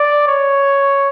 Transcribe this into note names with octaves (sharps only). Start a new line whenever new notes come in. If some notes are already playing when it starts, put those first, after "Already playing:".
Already playing: D5
C#5